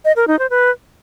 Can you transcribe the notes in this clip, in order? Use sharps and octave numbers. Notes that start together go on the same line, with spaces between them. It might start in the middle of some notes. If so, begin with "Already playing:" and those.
D#5
A#4
D#4
C5
B4